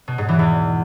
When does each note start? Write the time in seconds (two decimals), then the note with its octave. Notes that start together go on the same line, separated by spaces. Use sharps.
0.08 B2
0.18 G#2
0.29 E3
0.39 E2